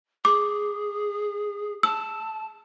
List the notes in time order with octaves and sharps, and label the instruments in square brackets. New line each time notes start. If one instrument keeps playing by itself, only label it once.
[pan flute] G#4 [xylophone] D6
[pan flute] A5 [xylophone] E6